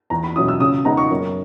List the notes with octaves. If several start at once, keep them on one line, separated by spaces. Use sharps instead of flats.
E2 A#5
B5
B2 F#3 C#4 E4 D#6
E6
C#3 D#6
G#3 B3 D#4 A#5
C#6
F#2